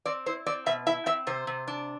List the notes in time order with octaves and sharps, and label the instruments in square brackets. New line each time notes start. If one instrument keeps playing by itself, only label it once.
[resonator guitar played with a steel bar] C4 D5
E4 C5
C4 D5
B2 E5
E4 E5
C4 E5
C3 C5
C3
D4